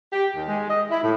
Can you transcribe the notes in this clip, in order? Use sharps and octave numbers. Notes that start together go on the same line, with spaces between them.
G4
D#2
G#3
D#5
E4
A2